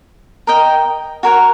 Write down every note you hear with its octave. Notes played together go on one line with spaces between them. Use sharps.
A#4 D#5 G5
F#4 A#4 C#5 F#5